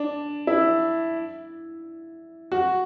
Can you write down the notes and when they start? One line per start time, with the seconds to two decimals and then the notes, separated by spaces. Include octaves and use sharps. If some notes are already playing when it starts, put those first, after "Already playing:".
Already playing: D4
0.47 E4
2.52 F#4